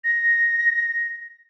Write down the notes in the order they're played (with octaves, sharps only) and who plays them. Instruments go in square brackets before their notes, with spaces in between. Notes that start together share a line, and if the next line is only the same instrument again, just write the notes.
[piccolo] A#6